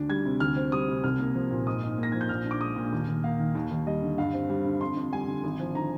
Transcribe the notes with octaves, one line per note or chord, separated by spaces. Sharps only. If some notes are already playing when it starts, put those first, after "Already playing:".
Already playing: D2 D4
G3 G#6
C3
D2 F6
C4
G3 D#6
C3
C2 F6
A#3
F3
A#2
G#2 D#6
D#4
A#3
A#6
F3 G#6
G6
A#1 F6
D4
D6
G#3 D#6
A#2
D#2
D#2
A#3 F5
D#3
D#2
D#2
G3 D#5
D3
G2 F5
C4
G3
D3
F2 C6
F2
G3 G#5
D3
G#1
F3
D3 A#5